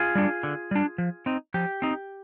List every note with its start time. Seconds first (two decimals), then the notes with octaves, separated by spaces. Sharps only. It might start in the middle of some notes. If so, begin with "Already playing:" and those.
Already playing: F4 G#4
0.15 G3 D4
0.43 D3
0.71 G3 D4
0.98 F3
1.26 C4 D#4
1.54 F3 G4
1.82 C4 D#4